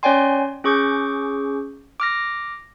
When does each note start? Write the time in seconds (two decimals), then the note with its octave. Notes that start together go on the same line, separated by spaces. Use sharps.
0.03 C#4 C#5 D5 G5 G#5 C6
0.64 C#4 G#4 C#6 D6 G6
2.00 D6 F6 A#6